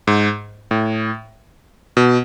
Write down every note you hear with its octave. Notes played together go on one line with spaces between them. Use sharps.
G#2
A2
B2